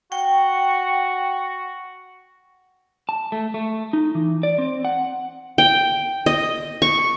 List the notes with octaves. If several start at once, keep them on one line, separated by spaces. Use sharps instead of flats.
F#4 G5
A5
A3
A3
D#4
E3
D5
C4
F#5
G5
D#5
C#6